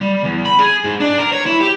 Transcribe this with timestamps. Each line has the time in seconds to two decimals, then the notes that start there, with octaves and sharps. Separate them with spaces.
0.01 G3
0.24 E2
0.46 B5
0.59 G#4
0.84 G#2
1.00 D4
1.18 A#4
1.32 C#5
1.46 E4
1.60 G4